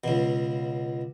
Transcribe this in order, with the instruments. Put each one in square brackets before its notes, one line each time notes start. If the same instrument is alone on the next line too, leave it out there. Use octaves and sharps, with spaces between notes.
[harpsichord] C#2 B2